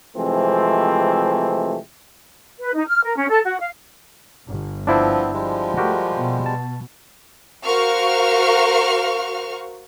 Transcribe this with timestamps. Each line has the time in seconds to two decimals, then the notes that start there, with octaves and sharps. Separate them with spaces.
0.17 C3 E3 F3 G#3 A3 C4
2.60 B4
2.74 D#4
2.87 F6
3.04 A#4
3.16 C#4
3.29 A4
3.45 F#4
3.59 F5
4.46 G1
4.87 F3 B3 C4 D4 E4 C5
5.34 F3 G3 G#3
5.77 A3 F#4 G4 A#4
6.13 B2
6.46 A5
7.65 F#4 A#4 C5 F5 C#6 F6